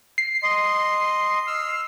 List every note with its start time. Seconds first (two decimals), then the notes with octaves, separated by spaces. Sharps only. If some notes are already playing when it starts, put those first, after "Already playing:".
0.18 C7
0.43 D#5 C6
1.47 E6 F6